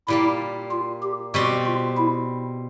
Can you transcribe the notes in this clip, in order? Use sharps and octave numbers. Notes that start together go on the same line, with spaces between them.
A#2 G3 A#3 E4
F4
G4
B2 G3 C4 F#4
F4
E4